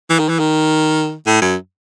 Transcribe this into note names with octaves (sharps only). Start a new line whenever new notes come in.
E3
D#3
E3
D#3
A2
F#2